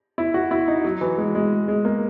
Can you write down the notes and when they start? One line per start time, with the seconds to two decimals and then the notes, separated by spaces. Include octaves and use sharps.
0.18 E4
0.34 F#4
0.51 E4
0.68 D#4
0.85 F#3
1.01 E3
1.18 G#3
1.35 G#3
1.68 G#3
1.85 A#3